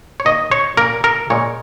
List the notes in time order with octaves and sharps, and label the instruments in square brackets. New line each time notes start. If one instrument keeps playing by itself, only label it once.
[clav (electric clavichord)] C#5
D#3 A#3 D#5
C#5
A#2 A#3 A#4
A#4
A#2 G#3 C#5